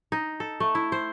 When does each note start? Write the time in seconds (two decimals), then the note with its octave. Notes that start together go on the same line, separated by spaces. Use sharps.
0.12 D#4
0.40 A4
0.60 A3
0.75 E4
0.92 C5